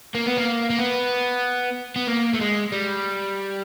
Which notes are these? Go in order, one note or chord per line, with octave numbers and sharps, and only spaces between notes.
A#3
B3
A#3
A#3
B3
B3
A#3
A3
G#3
G3